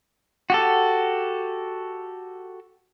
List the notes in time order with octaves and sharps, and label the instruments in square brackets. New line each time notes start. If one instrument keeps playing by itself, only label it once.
[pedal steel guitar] F#4 G4 A4